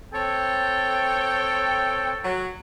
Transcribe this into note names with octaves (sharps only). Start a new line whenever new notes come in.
C4 A4 C#5 G5
F#3